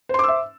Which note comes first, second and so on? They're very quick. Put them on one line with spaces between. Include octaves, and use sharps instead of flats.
C5 C6 D6 E6 E5